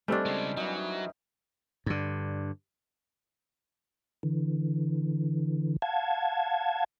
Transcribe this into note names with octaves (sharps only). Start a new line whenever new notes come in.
D#3 G3 A3 C4 D4 A4 G#5
C#3 G#3
E3 F#3 D#4
G2 D3
D3 E3
F5 F#5 A5 G#6